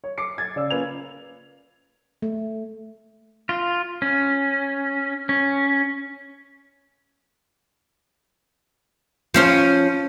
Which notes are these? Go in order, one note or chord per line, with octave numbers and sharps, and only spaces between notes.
C#5
D6 C7 C#7
G#6 A6
C#3 D5 E6
A#3 C#4 F4 B4 G#6 F7
A3
F4
C#4
C#4
F3 C#4 C5